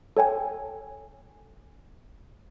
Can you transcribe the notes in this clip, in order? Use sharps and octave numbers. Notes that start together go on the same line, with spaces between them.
A4 C#5 G5 G#5